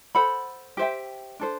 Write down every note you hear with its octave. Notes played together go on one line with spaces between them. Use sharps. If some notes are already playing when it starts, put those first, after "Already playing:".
A4 C5 F#5 B5
G4 C5 E5 G5
D4 A4 C5